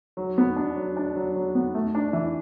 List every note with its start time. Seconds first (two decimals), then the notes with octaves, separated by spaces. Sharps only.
0.17 F#3
0.38 B3
0.56 D4
0.76 F#3
0.97 D4
1.16 F#3
1.36 F#3
1.55 B3
1.75 A3
1.95 D4
2.13 E3